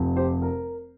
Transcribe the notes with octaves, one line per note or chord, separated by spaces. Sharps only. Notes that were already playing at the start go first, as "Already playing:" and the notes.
Already playing: F1 F2 F3
G4 C5
A#4